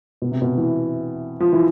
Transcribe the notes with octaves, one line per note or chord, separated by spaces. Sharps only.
B2
C3
B2
E3
F3
E3